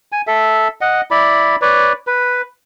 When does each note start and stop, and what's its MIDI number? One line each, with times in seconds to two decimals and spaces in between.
0.12 0.22 80
0.27 0.68 69
0.27 0.68 76
0.81 1.01 75
0.81 1.01 78
1.11 1.56 64
1.11 1.56 74
1.11 1.56 83
1.62 1.93 71
1.62 1.93 73
1.62 1.93 74
2.07 2.42 71